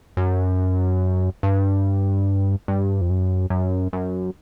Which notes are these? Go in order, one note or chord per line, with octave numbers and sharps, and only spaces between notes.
F#2
G2
G2
F2
F#2
F#2
F#2